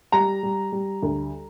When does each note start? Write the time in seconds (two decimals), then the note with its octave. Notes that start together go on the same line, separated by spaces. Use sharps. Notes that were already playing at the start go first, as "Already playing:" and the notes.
0.12 G3 A#5
0.43 G3
0.72 G3
1.03 D2